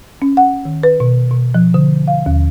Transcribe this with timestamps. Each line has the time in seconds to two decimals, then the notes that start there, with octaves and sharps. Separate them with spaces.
0.22 C#4
0.37 F#5
0.65 D#3
0.83 B4
1.00 B2
1.31 B2
1.54 F3
1.74 D3
2.08 F5
2.26 D#2